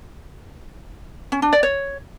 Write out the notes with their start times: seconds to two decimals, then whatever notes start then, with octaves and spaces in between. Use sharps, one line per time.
1.32 C#4
1.42 D4
1.53 D5
1.63 C#5